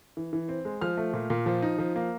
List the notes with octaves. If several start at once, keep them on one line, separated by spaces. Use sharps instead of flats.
E3
E3
C4
G#3
F3 F6
A3
A#2
A#2
F3
D#4
F3
A#3